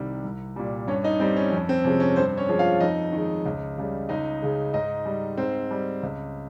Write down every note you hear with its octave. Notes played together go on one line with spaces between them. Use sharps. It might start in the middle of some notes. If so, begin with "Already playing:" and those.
Already playing: C2 C3 D#3 G3
C2
A#2 G3
G2 C#4 C#5
D#4 D#5
G3 C4 C5
C#4
F2 C#4
C4
C3 F3 G#3 C#4
C#4
G2 C4 C5
C#4 C#5
F3 G#3
F4 F5
F2 D#4 D#5
D#3 G#3
C#2
C#3 G3
C#2 D#4 D#5
C#3 G#3
G#2 D#4 D#5
G3
G#2 C4 C5
G3
C#2